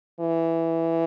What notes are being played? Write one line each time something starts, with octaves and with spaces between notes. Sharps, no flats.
E3